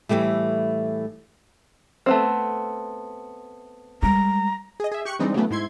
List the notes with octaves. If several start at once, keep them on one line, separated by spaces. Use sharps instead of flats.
A2 E3 F3 G3 A3
A3 B3 C4
G3 G#3 A#5
G#4 D#5
G#4 E5
G4 C#6 F#6 C#7
E3 G3 G#3 C4 D4 D#4
C#3 E3 F#3 A3 B3
G#2 E4 C6 G#6